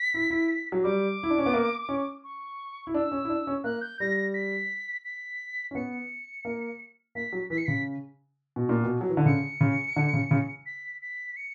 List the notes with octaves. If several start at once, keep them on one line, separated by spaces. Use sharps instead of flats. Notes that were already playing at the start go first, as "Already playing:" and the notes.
Already playing: B6
E4
E4
F#3
G3 D6
E4
D4
C#4
B3
A#3
C#4
C#6
E4
D4 E6
C#4
E4
D4
C#4
A#3 F#6
G6
G3 A#6
A#6
B6
B6
C#4
B3 C#7
A#3
A#3 B6
F#3
E3 B6
C#7
C#3 B6
B2
A#2
B2
F#3
E3
D3
C#3 C#7
C#3
D3
C#3
C#3
B6
B6
C#7